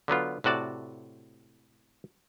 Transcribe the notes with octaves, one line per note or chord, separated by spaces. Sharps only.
D3 F#3 B3 F4
A2 C3 F#4 D5 A5